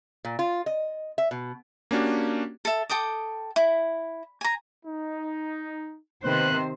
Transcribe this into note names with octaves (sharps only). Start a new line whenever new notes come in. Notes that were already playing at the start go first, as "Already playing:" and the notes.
A#2
F4
D#5
E5
B2
A#3 C#4 D4 F#4 G4
A4 E5
A4 G5 D6 D#6
E4
G#5 A#5
D#4
C3 D#3 A#3 B3 B4 C5 F#6